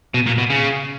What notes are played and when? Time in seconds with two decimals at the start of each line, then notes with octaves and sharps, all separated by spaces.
0.14 B2
0.27 A#2
0.38 B2
0.50 C#3